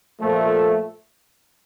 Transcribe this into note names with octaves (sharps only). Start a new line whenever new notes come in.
A#2 F3 A3